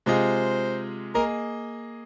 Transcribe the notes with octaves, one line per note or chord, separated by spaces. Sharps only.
C3 G#3 F4 G#4 C5 D#5
A#3 G#4 A#4 D#5